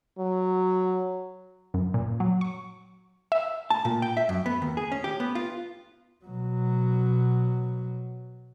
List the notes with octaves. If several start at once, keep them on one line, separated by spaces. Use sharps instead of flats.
F#3
F#2
A#2
F#3
C#6
E5
A5
A#2
G5
E5
F#2
B3
D#2
G#4
C#4
G4
B3
F4
B2 F#3